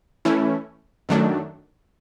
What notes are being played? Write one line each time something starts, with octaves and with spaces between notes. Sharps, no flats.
E3 A3 C#4 E4
F#2 D#3 F#3 A3 D4